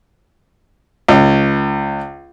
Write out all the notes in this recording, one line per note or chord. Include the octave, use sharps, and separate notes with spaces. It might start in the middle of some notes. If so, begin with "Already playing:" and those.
C#2